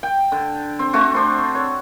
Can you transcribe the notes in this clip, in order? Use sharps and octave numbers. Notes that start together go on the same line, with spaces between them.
G5
D3
C4
A3 C4 F#4
D4 C5
C#5